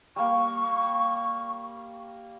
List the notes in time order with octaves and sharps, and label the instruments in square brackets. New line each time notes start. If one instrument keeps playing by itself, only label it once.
[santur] G3 A#3 [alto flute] C#6